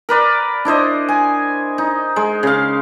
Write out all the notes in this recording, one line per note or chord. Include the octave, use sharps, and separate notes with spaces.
A#4 B4 D5
D4 E4 C5 D#5
G#5
D#4
G#3
C#3 F5